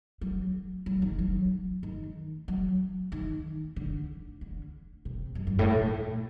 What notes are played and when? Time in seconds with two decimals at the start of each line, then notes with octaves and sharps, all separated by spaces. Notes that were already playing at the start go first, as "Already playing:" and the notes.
0.21 F#3
0.86 F#3
1.02 D#3
1.19 F#3
1.83 D#3
2.48 F#3
3.12 D#3
3.76 D3
4.41 D3
5.05 C3
5.35 F#2
5.47 G2
5.59 A2
5.70 A#2